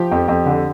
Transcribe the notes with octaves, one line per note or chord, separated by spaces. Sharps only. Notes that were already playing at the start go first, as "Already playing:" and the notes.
Already playing: F3 G4
F2
F2
D3